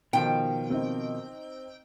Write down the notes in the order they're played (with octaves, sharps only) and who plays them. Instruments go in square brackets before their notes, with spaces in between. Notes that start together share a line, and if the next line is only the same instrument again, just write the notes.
[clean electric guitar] B2 D#3 F3 [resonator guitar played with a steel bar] G5
[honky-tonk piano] C4 D#4